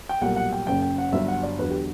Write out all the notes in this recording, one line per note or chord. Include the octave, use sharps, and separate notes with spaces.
G5
B1 A#2 G3 F#5
F#5
G5
F#1 F#2 C#3 G5
G5
F#5
G1 G2 D3 F#3 E5
F#5
D5
E2 D3 F#3 B4
G4